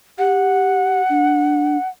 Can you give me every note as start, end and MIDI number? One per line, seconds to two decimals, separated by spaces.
0.18 1.02 67
0.18 1.88 78
1.09 1.77 62